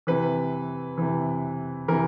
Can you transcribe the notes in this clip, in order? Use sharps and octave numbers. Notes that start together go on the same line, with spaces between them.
C3 E3 B4
C3 E3
C3 E3 A#4